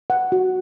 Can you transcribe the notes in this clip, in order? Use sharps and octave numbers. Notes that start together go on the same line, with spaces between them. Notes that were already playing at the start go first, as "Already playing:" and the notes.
F#5
F#4